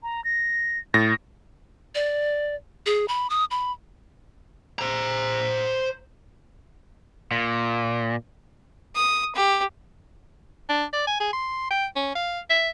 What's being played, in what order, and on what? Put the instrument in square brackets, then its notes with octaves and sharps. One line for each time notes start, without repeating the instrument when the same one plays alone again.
[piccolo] A#5
A#6
[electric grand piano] A2 A#6 [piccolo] A6
[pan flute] D5
G#4
B5
D#6
B5
[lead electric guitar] C5 A#5
[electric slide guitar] A#2
[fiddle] D#6
G4
[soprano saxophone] D4
D5
G#5
G#4
C6
G5
C#4
F5
E5